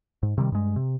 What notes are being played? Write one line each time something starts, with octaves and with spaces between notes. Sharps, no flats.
G#2
C3 D#3 G3
G2 G#3
C3